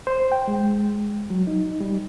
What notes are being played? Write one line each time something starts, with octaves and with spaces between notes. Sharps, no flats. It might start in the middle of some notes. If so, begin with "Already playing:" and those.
C5
G5
G#3
F#3
D#4
G3